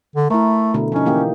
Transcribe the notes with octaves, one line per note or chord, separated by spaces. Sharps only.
D3
A3 E4 A#4
B2 D3 A3
F3 C#4 D#4
E3 A#3 G4